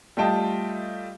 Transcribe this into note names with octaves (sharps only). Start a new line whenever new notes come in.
G3 A3 F4 D#5 G5 A5